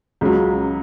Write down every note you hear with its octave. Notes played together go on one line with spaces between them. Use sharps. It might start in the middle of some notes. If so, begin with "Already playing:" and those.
C#2 C#3 F#3